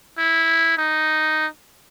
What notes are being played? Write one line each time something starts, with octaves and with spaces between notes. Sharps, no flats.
E4
D#4